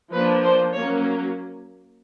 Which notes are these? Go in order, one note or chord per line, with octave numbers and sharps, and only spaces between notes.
F3 A#3 D4 B4
C5
F#3 A#3 C#4 C#5